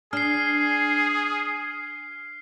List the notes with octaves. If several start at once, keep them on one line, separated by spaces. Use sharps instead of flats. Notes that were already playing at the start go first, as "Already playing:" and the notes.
D4 G#4 F6 C7